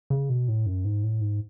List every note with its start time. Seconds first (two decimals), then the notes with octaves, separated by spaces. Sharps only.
0.10 C#3
0.30 B2
0.48 A2
0.66 F#2
0.85 G#2
1.03 A2
1.21 G#2